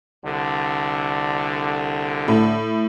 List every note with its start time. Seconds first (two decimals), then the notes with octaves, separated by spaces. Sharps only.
0.23 C2 D3
2.28 A2